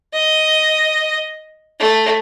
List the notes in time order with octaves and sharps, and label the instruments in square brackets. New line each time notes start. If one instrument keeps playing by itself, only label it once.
[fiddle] D#5
A3